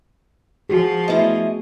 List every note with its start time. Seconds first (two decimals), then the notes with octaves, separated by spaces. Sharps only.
0.69 F3 F#4 G#4
1.08 A3 B3 E4 B4 D#5